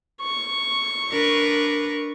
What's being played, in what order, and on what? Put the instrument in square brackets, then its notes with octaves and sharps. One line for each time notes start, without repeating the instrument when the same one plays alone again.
[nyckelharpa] C#6
[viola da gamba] D4 A#4 B4